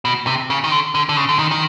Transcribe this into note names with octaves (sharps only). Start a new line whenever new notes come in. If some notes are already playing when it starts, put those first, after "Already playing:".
B2
C3
C#3
D#3
D3
D3
D3
C#3
D3
D#3
D#3